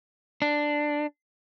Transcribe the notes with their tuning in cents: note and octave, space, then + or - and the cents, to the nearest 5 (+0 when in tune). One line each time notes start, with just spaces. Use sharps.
D4 +5